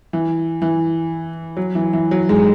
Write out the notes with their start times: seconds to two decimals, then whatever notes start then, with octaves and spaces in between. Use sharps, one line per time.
0.13 E3
0.62 E3
1.57 F#3
1.75 E3
1.93 E3
2.11 F#3
2.29 G#2 G#3